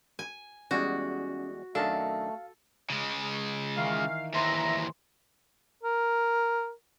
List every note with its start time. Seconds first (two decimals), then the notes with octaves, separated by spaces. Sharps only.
0.19 G#5
0.71 E2 G3 G#3 C#4 F#4
1.75 F#2 D#3 A3 D4 A4 F5
2.90 C#3 G#3
3.77 D#3 E3 D#4 F5
4.34 D#2 E3 C5 E5 A#5 C6
5.83 A#4